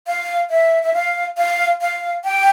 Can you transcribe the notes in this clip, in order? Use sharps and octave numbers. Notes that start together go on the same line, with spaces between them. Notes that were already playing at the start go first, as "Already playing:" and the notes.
F5
E5
E5
F5
F5
F5
G5